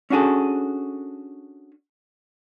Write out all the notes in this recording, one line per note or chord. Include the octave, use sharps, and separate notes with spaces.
C#4 D4 F#4 G#4 A4